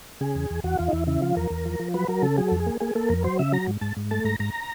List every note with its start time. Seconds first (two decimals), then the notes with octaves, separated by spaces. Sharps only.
0.21 C#3 G#4
0.35 E2
0.50 E2
0.64 E2 F#4
0.79 E2 F4
0.88 D#4
0.93 E2 E4
1.07 C#3 E4
1.22 F3 F4
1.36 E2 A#4
1.50 E2
1.66 F3
1.79 F3
1.94 F#3 B4
2.08 F#3 A#4
2.22 C#3 A4
2.38 F#3 G#4
2.48 F2 A4
2.60 G#4
2.66 A#3
2.80 A#3 G#4
2.95 A#3 A4
3.09 F2 A#4
3.24 F#3 C5
3.39 C#3 E5
3.52 F#3 A#5
3.67 G#2
3.81 G#2 A5
3.97 G#2
4.11 A3 A5
4.24 G#2 A#5
4.39 G#2 A#5